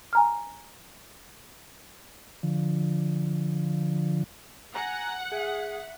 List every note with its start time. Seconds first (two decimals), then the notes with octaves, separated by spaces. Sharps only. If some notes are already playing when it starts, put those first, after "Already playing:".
0.13 G#5 A#5 F6
2.43 D3 F3
4.75 F#5 G#5 A#5
5.32 G#4 E5